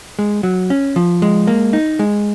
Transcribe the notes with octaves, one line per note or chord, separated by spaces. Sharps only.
G#3
F#3
C#4
F3
G#3
A#3
D#4
G#3